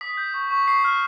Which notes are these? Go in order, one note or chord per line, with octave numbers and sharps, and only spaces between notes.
D#6 B6
G6
C#6
C#6
C#6 C7
F6